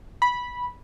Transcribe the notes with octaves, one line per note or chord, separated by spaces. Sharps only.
B5